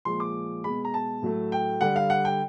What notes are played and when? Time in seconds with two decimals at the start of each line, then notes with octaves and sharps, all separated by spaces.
0.05 A#2 F3 G#3 C6
0.20 D6
0.64 B2 G#3 B5
0.85 A#5
0.94 A5
1.22 A2 F#3 A3
1.52 G5
1.81 D3 G3 F#5
1.96 F5
2.10 F#5
2.25 G5